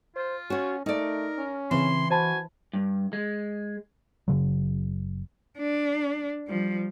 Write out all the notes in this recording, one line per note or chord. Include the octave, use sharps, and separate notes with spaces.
F4 C5
C#4 F#4 C#5
A3 D#4 A#4 D5
C#4
C#3 E3 C4 C6
F#4 C5 G#5 A5 B5
G2
G#3
F#1 C#3 F#3
D4
F3 G3